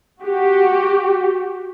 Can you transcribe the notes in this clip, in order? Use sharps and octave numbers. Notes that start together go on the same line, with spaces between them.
F#4 G4